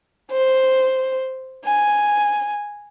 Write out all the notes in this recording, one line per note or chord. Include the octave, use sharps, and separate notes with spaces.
C5
G#5